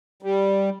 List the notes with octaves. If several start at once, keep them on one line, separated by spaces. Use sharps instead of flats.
G3